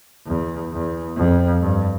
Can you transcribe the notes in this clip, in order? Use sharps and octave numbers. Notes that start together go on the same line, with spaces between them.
E2
E2
F2
G2